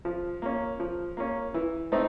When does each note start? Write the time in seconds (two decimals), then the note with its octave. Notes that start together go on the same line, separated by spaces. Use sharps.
0.05 F3
0.42 A#3 C#4
0.80 F3
1.17 A#3 C#4
1.54 E3
1.92 A3 C4 D#4